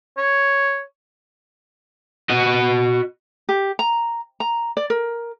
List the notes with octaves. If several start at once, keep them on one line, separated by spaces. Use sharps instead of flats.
C#5
F#4 D#5
G4
A#5
A#5
D5
A#4